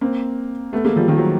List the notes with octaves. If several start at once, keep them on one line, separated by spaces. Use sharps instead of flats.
A#3 C4
A3 B3
G#3 A#3
F3 G3
D#3 F3
F#3